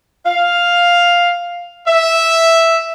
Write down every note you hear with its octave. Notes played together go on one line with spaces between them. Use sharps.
F5
E5